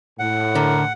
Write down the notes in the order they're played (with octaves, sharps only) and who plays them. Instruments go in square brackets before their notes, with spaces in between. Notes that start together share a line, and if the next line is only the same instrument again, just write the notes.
[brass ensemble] A2 [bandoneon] F#5
[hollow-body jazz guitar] D3 [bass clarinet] A#4